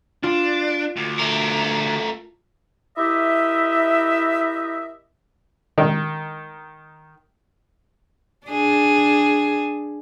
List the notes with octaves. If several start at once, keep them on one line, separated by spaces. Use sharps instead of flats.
D4 F4
D2
A3 A#4
E4 G4 A#4 D#5 E5
D#3
D4 G#4